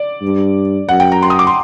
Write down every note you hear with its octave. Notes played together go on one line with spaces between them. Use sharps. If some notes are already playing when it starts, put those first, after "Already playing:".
Already playing: D5
G2
F#2 F#5
G5
A#5
C6
D#6
D6
C6